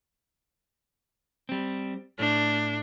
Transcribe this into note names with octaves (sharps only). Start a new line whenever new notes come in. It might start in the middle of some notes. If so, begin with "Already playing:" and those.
G3 C4
A2 A3 D4